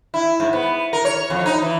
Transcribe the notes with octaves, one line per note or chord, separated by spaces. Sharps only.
E4
G#2
B3
A#4
C#5
F2
D#4
E3